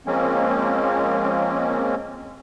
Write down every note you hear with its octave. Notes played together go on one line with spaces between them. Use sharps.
F3 G#3 A#3 C4 C#4